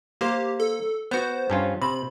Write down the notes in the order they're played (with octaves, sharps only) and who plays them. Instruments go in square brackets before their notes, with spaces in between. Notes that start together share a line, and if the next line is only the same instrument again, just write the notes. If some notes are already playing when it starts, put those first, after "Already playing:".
[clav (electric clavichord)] A#3 C5 [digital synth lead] G4
[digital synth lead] A4
[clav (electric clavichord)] B3 F#4 [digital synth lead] C5
[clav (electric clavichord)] G2 C#4 F4
[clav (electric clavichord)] C3 [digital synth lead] B5